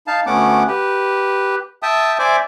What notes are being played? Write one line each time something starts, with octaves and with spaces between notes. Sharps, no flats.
D#4 F5 A5
D2 A3 B3 C#4 F#5 D6
G4 B4
E5 G5 A5 D#6
C5 D5 E5 G#5 D6